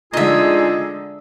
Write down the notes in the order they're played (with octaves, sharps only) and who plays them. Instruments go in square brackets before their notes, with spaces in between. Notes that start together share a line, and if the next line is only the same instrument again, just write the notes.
[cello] D3 G#3 [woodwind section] D#4 F4 G#4 [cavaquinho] D#5 E5